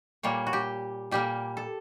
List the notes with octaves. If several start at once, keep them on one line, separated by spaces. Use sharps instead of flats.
A#2 G3 A#3 C#5
F#4
G4
A#2 G3 A#3 G4
A4